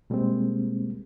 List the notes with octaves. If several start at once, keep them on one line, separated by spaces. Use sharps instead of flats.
B2 G3 G#3 A#3 C4